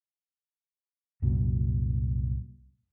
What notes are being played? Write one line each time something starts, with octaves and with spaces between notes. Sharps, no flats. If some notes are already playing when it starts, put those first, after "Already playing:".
C2 F#2 A#2 F#3